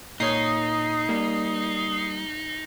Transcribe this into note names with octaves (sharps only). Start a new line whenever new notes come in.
A#2 A#3 D#4 C#5 D#6 C7
G3 A#3